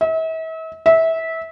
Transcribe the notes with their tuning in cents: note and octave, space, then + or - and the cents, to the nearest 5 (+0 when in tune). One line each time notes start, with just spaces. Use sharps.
E5 -40
E5 -20